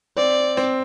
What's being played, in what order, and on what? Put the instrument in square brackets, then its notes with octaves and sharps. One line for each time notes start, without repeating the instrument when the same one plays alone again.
[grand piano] C4 [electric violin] D5
[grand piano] C4